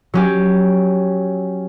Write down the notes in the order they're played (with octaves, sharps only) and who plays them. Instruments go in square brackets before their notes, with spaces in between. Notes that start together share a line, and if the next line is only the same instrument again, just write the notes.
[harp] F#3 C#4 G4